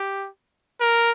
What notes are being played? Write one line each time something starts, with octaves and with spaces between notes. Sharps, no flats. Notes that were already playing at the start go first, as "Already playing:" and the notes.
Already playing: G4
A#4